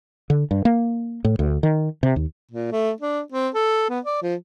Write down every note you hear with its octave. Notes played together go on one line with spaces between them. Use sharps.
D3
G2
A#3
A2
D2
D#3
C3
D#2
A#2
A3
D4
C4
A4
B3
D5
F3